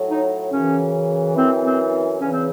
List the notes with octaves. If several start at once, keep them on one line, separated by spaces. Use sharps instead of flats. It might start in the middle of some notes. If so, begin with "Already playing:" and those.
Already playing: A2 F#3
D#4
F#2 C#3 E3 C#4
F#2 E3 C4
C4
E2 C#3 E3 C#4
C4